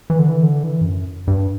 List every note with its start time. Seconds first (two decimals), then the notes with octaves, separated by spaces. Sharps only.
0.10 E3
0.19 D3
0.28 E3
0.43 D3
0.63 E3
0.81 G2
0.85 F#2
1.27 G2